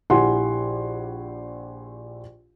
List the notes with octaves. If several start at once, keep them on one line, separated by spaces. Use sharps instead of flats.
A#1 E4 G4 F#5 G#5 C6